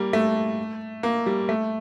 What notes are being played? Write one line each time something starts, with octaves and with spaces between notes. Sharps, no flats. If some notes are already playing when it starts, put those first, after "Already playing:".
Already playing: G3 A#3
A3
A#3
G3
A3